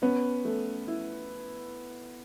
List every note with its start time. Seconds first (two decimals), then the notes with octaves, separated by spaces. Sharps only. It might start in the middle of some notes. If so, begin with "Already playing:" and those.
0.02 B3 C#4
0.45 A3
0.88 E4